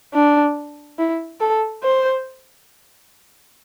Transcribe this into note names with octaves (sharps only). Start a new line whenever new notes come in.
D4
E4
A4
C5